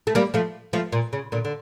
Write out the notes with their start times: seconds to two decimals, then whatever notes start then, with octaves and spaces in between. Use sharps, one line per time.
0.07 A3
0.15 G3 A#3
0.34 F3 A3
0.73 F3 A3
0.92 A#2
1.13 C#3
1.32 A#2 D3
1.45 D3